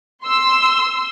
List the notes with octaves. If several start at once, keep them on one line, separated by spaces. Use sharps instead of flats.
C6 E6